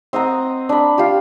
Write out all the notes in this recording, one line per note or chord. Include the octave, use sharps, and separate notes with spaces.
C4 D#5 F#5 A#5
D4 B5
F4 G4